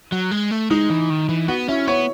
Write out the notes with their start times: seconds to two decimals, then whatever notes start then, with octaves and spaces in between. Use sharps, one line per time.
0.12 F#3
0.31 G#3
0.51 A3
0.70 G#3 D#4
0.90 E3
1.10 D#3
1.29 E3
1.48 B3 F#4
1.68 C#4 E4
1.87 B3 C#5